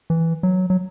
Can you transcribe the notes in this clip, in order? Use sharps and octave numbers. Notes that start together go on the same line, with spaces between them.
E3
F#3
F#3